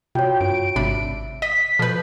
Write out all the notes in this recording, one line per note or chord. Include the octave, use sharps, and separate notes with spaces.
C3 F4 F#4 C#5 G5
G2 D7
G#1 C3 D4 E5 B5
D#5 B6
B2 F3 A4 B4 G6